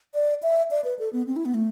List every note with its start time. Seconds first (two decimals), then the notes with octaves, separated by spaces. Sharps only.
0.14 D5
0.43 E5
0.71 D5
0.84 B4
0.99 A4
1.13 B3
1.27 C4
1.36 E4
1.45 B3
1.54 A3